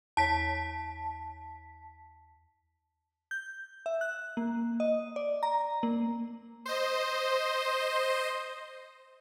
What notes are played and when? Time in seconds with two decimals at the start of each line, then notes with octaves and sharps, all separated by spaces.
0.17 E2 C#5 A5 B6
3.31 G6
3.86 E5
4.01 F#6
4.37 A#3
4.80 D#5
5.16 D5
5.43 A#5
5.83 A#3
6.65 C5 D#5